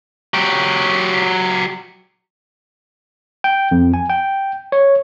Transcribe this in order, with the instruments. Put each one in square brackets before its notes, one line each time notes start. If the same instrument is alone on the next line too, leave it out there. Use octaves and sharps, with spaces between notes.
[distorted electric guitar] F#3 G4
[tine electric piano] G5
F2
G#5
G5
C#5